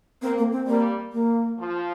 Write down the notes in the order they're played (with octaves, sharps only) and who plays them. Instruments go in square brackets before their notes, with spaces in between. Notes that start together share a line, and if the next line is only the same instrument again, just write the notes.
[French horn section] A#3 [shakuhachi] C4
[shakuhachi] A#3
C4
[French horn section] G3 [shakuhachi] A#3
[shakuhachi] A#3
[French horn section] F3